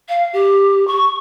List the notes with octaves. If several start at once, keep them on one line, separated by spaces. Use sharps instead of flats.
F5
G4
C#6